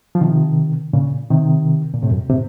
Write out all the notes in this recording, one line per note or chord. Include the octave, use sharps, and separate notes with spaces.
F3
C3 D#3
A#2 C#3
C3 D#3
A#2
A2 C3
F#2
A2 C3